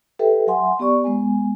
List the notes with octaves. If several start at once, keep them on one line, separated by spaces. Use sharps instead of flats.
G4 A4 B4 E5 G5
F#3 E5 F#5 G#5 C6
B3 G4 D5 C#6
G#3 B3 G#5